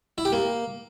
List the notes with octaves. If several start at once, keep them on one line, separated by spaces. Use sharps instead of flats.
E4
G4
A#3